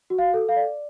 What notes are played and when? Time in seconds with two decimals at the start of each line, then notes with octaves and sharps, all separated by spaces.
0.10 F#4
0.18 F5
0.34 A4
0.49 F5
0.56 D5